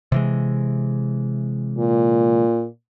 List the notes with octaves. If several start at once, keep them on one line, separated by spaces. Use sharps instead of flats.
C3 E3 G#3
A#2